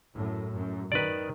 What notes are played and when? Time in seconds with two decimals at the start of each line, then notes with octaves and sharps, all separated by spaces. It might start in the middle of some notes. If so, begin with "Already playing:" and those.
0.14 F#2 A2
0.52 F#2
0.92 D#3 B4 D5